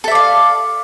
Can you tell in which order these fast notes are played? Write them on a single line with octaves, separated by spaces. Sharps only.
A4 E5 D5 F5